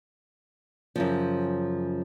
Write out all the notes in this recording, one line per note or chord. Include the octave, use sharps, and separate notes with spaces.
F#2 C#3 F3